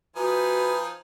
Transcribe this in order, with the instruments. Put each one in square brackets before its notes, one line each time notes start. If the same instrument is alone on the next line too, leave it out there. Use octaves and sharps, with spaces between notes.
[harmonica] F3 D#4 G#5 [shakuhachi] F#4 [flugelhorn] B4